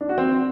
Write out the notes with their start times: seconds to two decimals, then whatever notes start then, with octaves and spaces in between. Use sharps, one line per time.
0.01 D4
0.09 F#4
0.18 C4